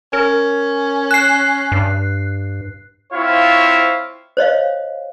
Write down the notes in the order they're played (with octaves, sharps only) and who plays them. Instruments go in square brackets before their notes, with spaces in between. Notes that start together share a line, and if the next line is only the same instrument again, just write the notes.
[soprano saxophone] C#4 [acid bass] A#4
[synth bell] F#6 C7
[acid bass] G2
[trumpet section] C4 E4 F4 C5 C#5 F5
[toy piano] C5 C#5 D#5 F5